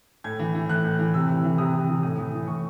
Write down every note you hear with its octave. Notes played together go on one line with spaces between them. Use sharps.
A2 G#6
E3
E3
A2 F#6
A2
E3
C3 E6
E3
E3
C3 D#6
C3
E3
A2 D#6
E3
E3
A2 C#6